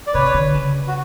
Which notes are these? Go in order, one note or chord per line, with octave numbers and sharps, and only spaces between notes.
D5
C3 B4 C#5
D3
C#3
F#4